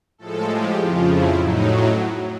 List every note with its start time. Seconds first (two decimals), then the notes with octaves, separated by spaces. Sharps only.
0.18 A2 F3 G#3 A4
0.49 G4
0.78 F2 C#3 F3 F4
1.08 E4
1.39 A2 F#3 D#4